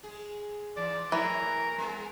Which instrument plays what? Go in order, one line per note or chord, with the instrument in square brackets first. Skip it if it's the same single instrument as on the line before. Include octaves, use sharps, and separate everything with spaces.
[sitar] G#3 G#4
[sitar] G#2 E3 [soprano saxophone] D5
[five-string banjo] E3 [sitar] F3 A3 C#5 [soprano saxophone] A#4
[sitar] G3 B3 G#4